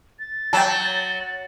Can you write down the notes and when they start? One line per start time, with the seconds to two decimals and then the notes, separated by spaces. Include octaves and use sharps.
0.19 A6
0.53 F#3 G5 A5